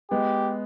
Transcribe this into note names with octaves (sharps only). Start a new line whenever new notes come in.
G#3 B3 G4